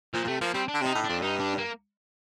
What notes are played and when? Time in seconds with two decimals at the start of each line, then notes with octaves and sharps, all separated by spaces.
0.14 A#2 F3
0.24 A#2
0.27 C3 A3
0.41 F3 A#3
0.54 G3 C4
0.68 D4
0.74 D3
0.81 C3 D#4
0.95 A2
1.04 F2 D4
1.22 G2 D#4
1.40 D4
1.58 A#3